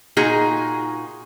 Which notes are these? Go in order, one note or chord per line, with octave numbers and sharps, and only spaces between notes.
A#2 D#4 F#4 G#4